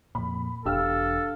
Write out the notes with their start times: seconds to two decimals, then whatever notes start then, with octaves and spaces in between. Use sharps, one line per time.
0.15 F2 A#2 B5
0.65 E1 D4 G4 A4 F5 E6 F6